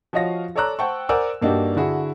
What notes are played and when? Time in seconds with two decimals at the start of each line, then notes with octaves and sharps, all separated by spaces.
0.13 F3 F#4 C#5 D#5 F5 A#6
0.56 A4 C#5 D5 A#5 E6 F#6
0.79 C5 F#5 G5 A5 C#6
1.09 A#4 C5 D5 F#5 G#5 E6
1.42 G2 A#3 D4 D#4 F#4 G4
1.76 D3 E4 F#4 G#4